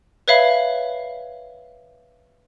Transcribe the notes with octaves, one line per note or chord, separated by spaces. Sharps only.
B4 C#5 E5 F5 B5